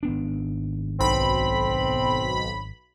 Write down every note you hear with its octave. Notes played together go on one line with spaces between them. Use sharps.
G#1 B3 D4
B1 C4 B5